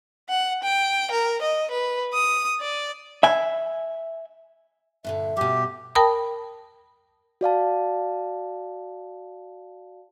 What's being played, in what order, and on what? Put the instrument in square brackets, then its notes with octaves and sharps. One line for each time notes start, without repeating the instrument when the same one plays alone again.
[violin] F#5
G5
A#4
D#5
B4
D#6
D5
[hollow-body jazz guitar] E5 G#5
[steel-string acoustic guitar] G2 A#2 D3 [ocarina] E5
[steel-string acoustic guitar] B2 G3 [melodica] G4
[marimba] A#4 G5 A5 B5 D#6
[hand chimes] F#4 D5 F5 A5